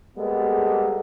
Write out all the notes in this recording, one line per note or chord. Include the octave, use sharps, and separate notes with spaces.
G3 G#3 A#3 B3 A4